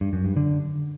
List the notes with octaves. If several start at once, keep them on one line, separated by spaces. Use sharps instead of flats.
G2
F#2
G2
D3